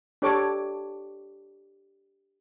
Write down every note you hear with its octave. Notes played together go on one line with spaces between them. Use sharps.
D4 G4 A4 C#5 D6